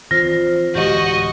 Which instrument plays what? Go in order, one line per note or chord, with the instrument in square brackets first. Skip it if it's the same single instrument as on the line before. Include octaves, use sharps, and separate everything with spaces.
[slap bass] E3 F3 C4 [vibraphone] F4 C5 [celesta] A#6
[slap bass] D1 E3 G#3 [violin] F#4 D#5 [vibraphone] G4